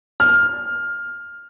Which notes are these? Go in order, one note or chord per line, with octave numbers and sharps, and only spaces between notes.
F6